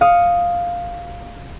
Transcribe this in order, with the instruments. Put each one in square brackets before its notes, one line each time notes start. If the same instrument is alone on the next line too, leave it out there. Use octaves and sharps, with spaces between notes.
[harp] F5 D#6 C#7